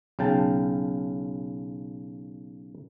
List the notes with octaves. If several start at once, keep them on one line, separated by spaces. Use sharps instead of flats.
B1 C#3 G5 A5